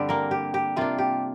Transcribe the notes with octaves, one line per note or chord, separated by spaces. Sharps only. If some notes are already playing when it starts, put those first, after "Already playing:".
Already playing: G2 D3 G3 C4 D4 G4
A#3 A#4
G4
G4
C3 A#3 D4 F4
G4